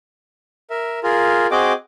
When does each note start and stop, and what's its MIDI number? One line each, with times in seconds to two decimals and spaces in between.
0.70 0.99 70
0.70 0.99 76
1.03 1.47 65
1.03 1.47 68
1.03 1.47 70
1.51 1.73 60
1.51 1.73 66
1.51 1.73 68
1.51 1.73 75
1.51 1.73 79
1.51 1.73 86